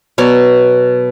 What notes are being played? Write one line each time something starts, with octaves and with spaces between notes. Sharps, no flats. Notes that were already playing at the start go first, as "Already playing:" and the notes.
B2 F#3 C#5 D5